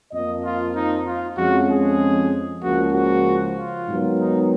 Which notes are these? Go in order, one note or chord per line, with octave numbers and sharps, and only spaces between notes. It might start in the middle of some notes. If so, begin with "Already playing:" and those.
F2 F3 A#3 D#5
F4
D#4
F4
F2 F3 G#3 C#4 F#4
G#4
C#2 C#3 F3 A#3 F#4
F#4
F4
G#2 D#3 F#3 B3
D#4